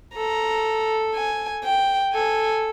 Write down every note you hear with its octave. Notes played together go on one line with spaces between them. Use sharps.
A4 A#5
G#5
G5
A4 G#5